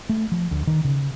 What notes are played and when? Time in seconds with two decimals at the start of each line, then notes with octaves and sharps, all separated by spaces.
0.09 A3
0.32 F3
0.51 D2
0.67 D#3
0.84 C#3